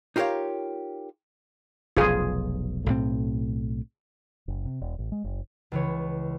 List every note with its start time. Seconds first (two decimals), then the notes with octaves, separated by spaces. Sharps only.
0.16 D#4 F4 G4 A#4 C#5 F5
1.97 F1 B1 F4 G#4
2.86 B1 A2 C4
4.48 F#1
4.65 C3
4.81 E1
4.99 A1
5.12 G#3
5.24 F#1
5.72 C#2 E3 C#5